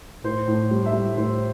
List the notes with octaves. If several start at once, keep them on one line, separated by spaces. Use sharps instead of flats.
A2 C5
A2
G3
E5
G3
A2 C5